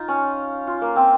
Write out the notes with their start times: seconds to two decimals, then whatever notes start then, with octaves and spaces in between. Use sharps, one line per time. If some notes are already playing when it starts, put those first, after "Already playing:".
Already playing: D#4 F4
0.08 C#4
0.67 F4
0.82 A#3
0.96 C4